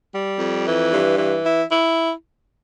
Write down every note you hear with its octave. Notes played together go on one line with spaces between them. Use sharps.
G3
F2
E3
G2
E3
E4
E4